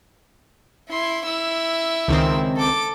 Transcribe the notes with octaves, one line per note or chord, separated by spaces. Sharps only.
E4 C6
E4 E6
C#2 D#3 C4
A4 D6